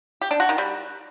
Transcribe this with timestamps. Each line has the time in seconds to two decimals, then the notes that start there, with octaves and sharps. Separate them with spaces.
0.21 G4
0.31 D4
0.40 F#4
0.49 D#3
0.58 G3